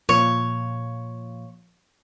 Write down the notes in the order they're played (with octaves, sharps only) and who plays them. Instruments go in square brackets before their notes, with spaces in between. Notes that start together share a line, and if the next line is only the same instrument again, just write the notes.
[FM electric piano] A#2 F3 [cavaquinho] C#5